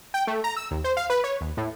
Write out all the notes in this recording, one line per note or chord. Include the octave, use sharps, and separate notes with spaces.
G5
A3
A#5
E6
D#2
C5
F5
B4
C#5
D#2
A2